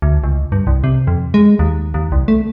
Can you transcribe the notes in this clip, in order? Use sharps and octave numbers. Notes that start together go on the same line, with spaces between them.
D2
C#2
G2
C2
C3
F2
G#3
D#2
D#2
C2
A3